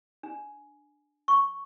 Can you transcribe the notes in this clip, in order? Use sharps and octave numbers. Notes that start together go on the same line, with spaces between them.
D4
C#6